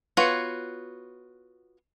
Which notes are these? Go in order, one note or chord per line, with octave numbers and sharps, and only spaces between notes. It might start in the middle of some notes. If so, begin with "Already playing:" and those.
B3 F4 F#4 C#5